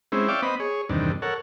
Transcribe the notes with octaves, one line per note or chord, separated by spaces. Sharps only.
G#3 C4 C#4 E4
C#5 D5 E5 F5 G5 D6
B3 C4 D#5 B5
G#4 C#5
E2 G2 C3 D#3 D4
A4 A#4 C#5 F#5